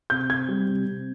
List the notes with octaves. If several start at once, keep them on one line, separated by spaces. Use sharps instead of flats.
C3 G6
C3 G#6
G3
C3
C3